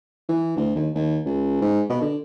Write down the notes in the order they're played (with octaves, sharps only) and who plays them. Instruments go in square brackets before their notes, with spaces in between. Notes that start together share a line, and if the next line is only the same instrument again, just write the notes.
[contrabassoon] E3
D2
D#2
D#2
C#2
G#2
B2
D3